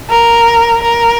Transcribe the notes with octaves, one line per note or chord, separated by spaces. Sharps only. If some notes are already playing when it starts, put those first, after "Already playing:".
A#4
A#4